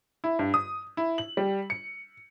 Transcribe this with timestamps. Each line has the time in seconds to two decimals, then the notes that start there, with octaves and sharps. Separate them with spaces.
0.24 E4
0.39 G2
0.54 D#6
0.97 E4
1.18 F#7
1.37 G3
1.70 C#7